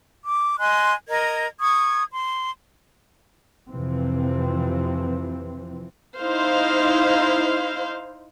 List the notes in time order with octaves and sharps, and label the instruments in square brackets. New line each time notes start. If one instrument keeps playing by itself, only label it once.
[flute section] D6
D#5 G#5 C6 F#6
A#4 D#5 G#6
C#6 D#6 G#6
C6
[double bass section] F2 C3 E3 F3 C4
[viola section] D#4 E4 C5 F5